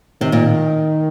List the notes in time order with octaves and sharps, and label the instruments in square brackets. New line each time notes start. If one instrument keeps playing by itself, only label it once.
[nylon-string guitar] C3 [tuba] D#3
[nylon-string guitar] A#2